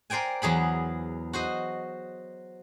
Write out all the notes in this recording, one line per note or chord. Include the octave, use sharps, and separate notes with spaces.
A#4 C5 D5 G5 G#5
E2 F#3 G#4 B5
F#4 C5 D#5